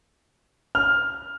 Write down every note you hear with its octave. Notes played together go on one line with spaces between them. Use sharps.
F6